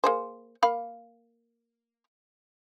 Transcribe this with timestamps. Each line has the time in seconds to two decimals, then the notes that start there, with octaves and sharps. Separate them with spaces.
0.04 A#3 G#4 C5
0.63 A#3 F5 B5